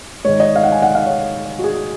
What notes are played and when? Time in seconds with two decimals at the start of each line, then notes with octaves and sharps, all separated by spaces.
0.25 G#2 D#3 G#3 C#5
0.40 D#5
0.56 F5
0.63 F#5
0.72 G#5
0.82 F#5
0.95 F5
1.06 C#5
1.59 F#4
1.64 G#4